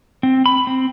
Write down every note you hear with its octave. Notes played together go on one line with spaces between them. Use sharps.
C4
B5
C4